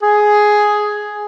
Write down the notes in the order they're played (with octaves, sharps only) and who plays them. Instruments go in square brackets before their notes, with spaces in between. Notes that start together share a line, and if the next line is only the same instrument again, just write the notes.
[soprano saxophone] G#4